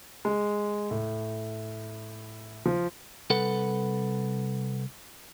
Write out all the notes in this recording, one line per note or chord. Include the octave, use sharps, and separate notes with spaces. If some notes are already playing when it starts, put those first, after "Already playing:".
G#3
A2
F3
C2 A4 B4 F#5